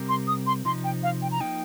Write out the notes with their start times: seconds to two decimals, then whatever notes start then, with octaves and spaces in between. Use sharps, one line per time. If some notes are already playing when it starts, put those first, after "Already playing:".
Already playing: C3 G3 C4 G4 A#4
0.09 C6
0.27 D#6
0.47 C6
0.65 C3 F3 D#4 C6
0.84 G5
1.03 F5
1.22 G5
1.31 A#5
1.41 F3 A#3 D#4 G5